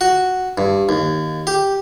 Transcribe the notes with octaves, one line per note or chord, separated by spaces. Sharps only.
F#4
G2
D#2
G4